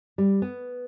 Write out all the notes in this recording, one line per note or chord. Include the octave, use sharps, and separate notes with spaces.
G3
B3